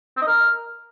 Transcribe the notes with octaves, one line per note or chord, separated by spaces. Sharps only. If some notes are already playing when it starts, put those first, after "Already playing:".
C4
D#5
A#4